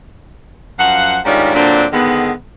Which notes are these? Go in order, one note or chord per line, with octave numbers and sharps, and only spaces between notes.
F#2 F3 F5 F#5
G#2 D#3 G3 C#4 D4 F4
A#2 D3 F#3 C4 D4
D3 D#3 G#3 B3